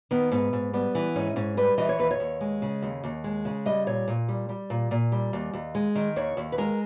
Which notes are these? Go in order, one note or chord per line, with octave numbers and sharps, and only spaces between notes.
D#3 B3
G#2 B3
G#2
G3 B3
E3
G#2 C#4
G#2 C#4
G3 B4
E3 D#5
C#5
D#2 B4
C#5
D#2
G#3
C#3
D#2
D#2
G#3
C#3
G3 D#5
A#2 C#5
A#2
G3
G3
A#2
A#2
G3
D#2
D#2
G#3
D#3
D#2 C#5
D#2
B4
G#3 A#4